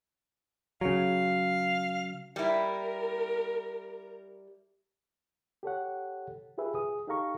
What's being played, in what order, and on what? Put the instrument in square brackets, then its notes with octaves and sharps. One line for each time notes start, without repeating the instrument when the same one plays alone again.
[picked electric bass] C#3 F#3 [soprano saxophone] F5
[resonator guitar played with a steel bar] G3 E4 [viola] A#4
[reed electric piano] G4 A4 C#5 F#5
F4 G4 G#4 B4 E5
G#4 D#6
D#4 G4 A4 F5 A#5 C#6